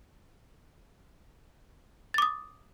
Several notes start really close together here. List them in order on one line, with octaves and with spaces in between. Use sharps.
A6 D6 D#6